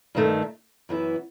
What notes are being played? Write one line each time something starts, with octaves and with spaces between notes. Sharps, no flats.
G2 D#3 A3 D#4
F#2 E3 B3 E4